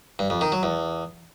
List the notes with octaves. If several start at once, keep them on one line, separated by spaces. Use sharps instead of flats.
G2
F2
D#3
F#3
E2